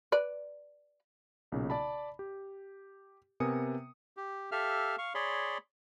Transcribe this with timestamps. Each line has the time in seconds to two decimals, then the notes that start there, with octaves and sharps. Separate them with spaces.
0.12 B4 D5
1.52 B1 A#2 C#3
1.70 D5 A5 B5
2.19 G4
3.40 C3 B3 A#4 G#5 D#6 C#7
4.17 G4
4.52 G4 A4 E5 F5 F6
4.98 F5 C#6
5.15 G#4 C#5 D5 B5 C6